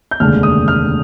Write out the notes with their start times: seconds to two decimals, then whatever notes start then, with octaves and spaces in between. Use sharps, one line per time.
0.11 G6
0.20 F1 D#2 D3 G#3 D4 F6
0.43 D#6
0.68 F6